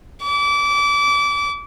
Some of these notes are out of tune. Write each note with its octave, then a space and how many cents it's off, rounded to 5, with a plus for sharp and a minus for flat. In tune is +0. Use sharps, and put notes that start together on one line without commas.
D6 -25